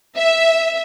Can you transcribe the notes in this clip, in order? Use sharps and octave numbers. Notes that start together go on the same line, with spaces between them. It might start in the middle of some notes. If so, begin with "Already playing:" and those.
E5